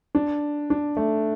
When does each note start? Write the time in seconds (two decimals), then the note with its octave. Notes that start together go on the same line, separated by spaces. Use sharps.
0.15 D4
0.70 D4
0.97 A3